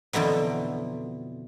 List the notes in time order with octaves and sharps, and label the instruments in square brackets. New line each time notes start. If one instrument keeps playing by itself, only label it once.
[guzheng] F2 B2 D3 E3 F#3